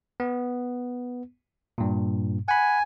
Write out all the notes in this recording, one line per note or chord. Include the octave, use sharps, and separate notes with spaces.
B3
G2 A#2
F#5 G#5 B5